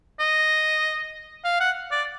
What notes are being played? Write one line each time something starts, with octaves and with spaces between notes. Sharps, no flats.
D#5
F5
F#5
D5